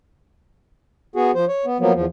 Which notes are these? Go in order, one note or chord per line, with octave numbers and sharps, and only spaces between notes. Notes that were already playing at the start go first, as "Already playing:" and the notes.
B3 F#4 G#4
F3 C5
C#5
B3
F3 F#3 A#3 B3
E2 F3